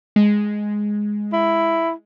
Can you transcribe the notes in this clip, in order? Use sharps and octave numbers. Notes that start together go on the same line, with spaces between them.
G#3
E4